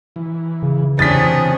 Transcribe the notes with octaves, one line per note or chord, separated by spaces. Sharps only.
E3
C#3
C3 E3 C#4 D4 D#6 A6 B6